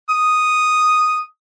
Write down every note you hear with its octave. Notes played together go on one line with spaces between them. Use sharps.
D#6